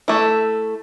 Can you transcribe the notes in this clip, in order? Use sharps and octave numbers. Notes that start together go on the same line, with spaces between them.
A3 E4